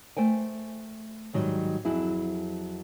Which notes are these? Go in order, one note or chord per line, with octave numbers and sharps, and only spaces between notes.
A3 C5 G5 G#5
G#2 D#3 F#3 G3
F2 F#3 E4 G#4